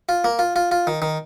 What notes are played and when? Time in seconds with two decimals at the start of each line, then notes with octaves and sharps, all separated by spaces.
0.09 F4
0.24 A#3
0.39 F4
0.56 F4
0.71 F4
0.87 D#3
1.02 D#3